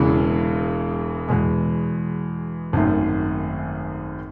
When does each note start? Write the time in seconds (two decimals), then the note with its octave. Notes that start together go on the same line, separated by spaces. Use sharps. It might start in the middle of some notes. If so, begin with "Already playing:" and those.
Already playing: E1 E2 C#3 E3 G#3
1.29 E2 B2 G#3
2.73 G#1 F#2 D#3 A3